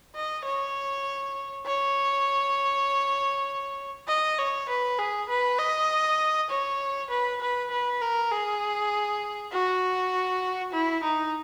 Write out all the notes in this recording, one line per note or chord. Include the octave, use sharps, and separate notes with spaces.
D#5
C#5
C#5
D#5
C#5
B4
G#4
B4
D#5
C#5
B4
B4
B4
A#4
G#4
F#4
E4
D#4